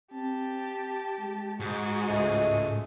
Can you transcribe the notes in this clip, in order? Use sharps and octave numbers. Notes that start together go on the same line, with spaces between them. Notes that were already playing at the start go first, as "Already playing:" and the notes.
C4 G4 A5
G#3
G#2 F#4 G#4
C#2 G#3 A3 D#5